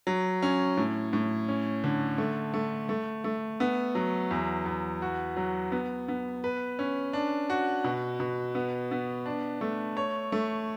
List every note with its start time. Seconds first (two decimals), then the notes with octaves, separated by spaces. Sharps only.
0.07 F#3
0.43 C#4
0.77 A2
1.13 A2
1.49 C#4
1.84 D3
2.18 A3
2.54 A3
2.89 A3
3.24 A3
3.60 B3
3.95 F#3
4.31 E2
4.66 E2
5.02 F#4
5.36 F#3
5.72 B3
6.08 B3
6.44 B4
6.79 C#4
7.13 D4
7.50 F#4
7.84 B2
8.20 B2
8.55 B3
8.91 B3
9.26 D4
9.61 A3
9.97 C#5
10.32 A3